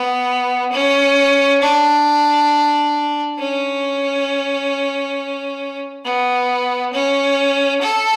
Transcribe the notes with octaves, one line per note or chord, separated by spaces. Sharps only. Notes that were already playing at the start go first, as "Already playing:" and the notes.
Already playing: B3
C#4
D4
C#4
B3
C#4
A4